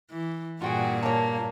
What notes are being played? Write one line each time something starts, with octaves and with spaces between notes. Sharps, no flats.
E3
G2 A#2 F4 F#4 G#4 F#5 G5
A#3 C#5 A5